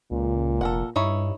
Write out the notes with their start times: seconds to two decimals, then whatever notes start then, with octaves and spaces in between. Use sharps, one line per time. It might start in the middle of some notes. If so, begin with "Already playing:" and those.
0.11 C#2 A#2
0.61 F1 A4 A#4 F#5
0.96 G2 D#4 E4 C#5